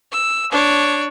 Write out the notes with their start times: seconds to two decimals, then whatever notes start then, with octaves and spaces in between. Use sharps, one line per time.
0.12 E6
0.52 D4 C#5